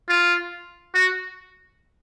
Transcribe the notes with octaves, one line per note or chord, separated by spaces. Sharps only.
F4
F#4